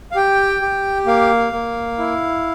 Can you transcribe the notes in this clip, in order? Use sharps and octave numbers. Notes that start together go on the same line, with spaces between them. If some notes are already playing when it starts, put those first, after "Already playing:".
F5
G4 G5
G4
A#3 F5
A#3
E4